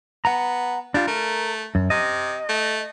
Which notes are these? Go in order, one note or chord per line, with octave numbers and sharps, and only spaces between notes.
B3 F#5 A#5
G3 D4 F4
A3 A#4
F#2
C3 D#5
A3